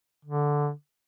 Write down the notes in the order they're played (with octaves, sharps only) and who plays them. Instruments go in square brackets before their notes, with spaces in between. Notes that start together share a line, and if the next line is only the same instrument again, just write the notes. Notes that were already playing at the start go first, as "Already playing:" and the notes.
[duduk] D3